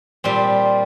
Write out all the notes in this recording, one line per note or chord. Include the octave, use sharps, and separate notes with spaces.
A#2 G3 C4